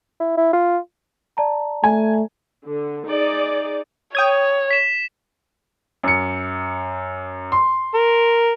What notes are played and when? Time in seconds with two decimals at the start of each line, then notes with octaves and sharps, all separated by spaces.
0.20 E4
0.37 E4
0.53 F4
1.37 D5 A5 A#5
1.84 A3 G#5
2.65 D3
3.06 D#4 G#4 D5
4.15 C#5 G5 D#6 G#6
4.71 B6 E7
6.03 F#2 C#7
7.52 C6
7.94 A#4